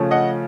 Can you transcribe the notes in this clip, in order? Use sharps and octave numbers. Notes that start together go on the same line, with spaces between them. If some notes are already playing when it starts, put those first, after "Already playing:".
Already playing: C#3 F3 A3 C#4
D#5 F#5